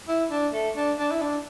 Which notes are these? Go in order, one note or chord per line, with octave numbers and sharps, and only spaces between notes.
E4
D4
A3
D4
D4
E4
D4